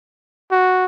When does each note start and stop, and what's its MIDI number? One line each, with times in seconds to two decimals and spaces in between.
0.51 0.86 66